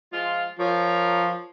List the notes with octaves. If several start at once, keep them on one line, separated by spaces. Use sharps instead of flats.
F3 G#3 F4
F3 A#4 C#5